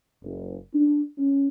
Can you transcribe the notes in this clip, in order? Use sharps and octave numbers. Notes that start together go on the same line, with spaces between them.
F#1
D4
C#4